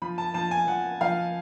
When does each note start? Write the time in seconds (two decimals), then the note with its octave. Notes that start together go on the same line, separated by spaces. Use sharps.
0.02 F3 B5
0.18 A5
0.34 F3 A5
0.51 G#5
0.68 F3 F#5
1.01 F3 F5